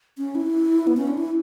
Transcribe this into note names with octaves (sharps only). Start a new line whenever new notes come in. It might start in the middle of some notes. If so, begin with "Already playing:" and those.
C#4
E4
B3
C#4
D4
E4